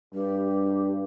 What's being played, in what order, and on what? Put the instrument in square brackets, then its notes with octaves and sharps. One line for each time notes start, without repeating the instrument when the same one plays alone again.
[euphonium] G2 [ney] G4